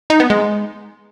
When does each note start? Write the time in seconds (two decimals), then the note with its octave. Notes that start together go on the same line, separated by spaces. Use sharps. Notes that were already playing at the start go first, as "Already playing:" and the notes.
0.10 D#4
0.20 B3
0.30 G#3